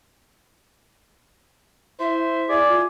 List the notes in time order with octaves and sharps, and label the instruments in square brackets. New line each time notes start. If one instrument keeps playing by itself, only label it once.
[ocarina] E4 [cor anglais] C5 [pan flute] E5
[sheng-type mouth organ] G#4 [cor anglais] D5
[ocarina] F4